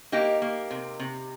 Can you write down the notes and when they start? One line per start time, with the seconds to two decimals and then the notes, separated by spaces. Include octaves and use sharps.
0.12 A#3 D#4 G4
0.42 A#3
0.71 C3
1.00 C3